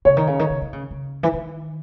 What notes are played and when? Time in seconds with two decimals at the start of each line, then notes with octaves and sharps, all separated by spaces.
0.05 C#3 C#5
0.17 D#3
0.27 C#3
0.39 D#3
0.50 C#3
0.62 D#3
0.73 C#3
0.91 C#3
1.23 E3
1.33 D#3